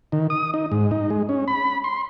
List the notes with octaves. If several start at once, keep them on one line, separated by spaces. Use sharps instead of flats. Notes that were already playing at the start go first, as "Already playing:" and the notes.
D#3
D#6
D#4
G#2
D#4
G#3
C#4
B5
C6